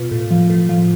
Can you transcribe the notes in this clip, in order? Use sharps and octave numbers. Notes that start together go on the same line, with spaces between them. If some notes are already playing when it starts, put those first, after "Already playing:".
Already playing: B2 F4
A2
F3
A2
F3